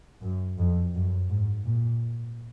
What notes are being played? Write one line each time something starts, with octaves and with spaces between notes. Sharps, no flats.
F#2
F2
F#2
G#2
A#2